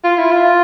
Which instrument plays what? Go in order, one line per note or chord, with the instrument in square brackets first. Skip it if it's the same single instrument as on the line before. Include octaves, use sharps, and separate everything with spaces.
[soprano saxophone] F4
E4
F4